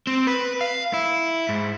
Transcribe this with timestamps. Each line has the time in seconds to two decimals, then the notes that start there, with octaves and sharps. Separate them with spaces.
0.07 C4
0.27 B4
0.61 F5
0.94 E4
1.49 G#2